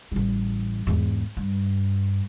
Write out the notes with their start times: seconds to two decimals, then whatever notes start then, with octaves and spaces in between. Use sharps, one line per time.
0.12 A1 G3
0.87 E2 G#2
1.37 G2